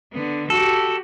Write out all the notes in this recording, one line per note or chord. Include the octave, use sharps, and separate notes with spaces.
D3 B3
F#4 G4 A4